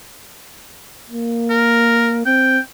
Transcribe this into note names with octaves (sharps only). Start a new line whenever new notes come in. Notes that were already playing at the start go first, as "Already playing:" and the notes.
A#3
A#4
C4 G5